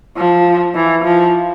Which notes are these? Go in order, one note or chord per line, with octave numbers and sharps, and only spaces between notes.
F3
E3
F3